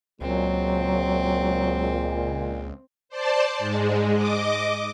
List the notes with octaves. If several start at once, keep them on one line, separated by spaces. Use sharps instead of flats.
C#2 A#2 F#3 G#3 C4
C5 D5 A5
G#2 G#3
D#5 D6